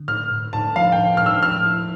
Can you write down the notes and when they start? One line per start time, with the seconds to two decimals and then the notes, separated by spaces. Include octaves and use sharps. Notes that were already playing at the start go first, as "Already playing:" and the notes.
Already playing: D3
0.08 A2 F6
0.31 A2
0.53 A2 A5
0.75 F3 F5
0.92 G5
0.98 A2
1.17 A2 F6
1.26 E6
1.43 F3 F6
1.66 E4